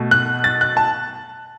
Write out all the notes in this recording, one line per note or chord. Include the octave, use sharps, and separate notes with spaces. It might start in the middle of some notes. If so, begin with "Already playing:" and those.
Already playing: B2 A3
F#6
A6
F#6
A5